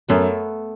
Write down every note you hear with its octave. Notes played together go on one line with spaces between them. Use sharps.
F#2 A3 B3